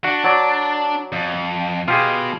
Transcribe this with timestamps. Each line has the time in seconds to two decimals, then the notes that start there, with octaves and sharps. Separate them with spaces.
0.04 D4 F#4
0.25 F#3 D5
1.12 F2
1.88 B2 F4 G4 G#4